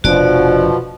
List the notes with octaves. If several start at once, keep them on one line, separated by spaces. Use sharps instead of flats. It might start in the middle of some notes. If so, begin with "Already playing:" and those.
F1 B2 F3 C4 D4 F#4 D5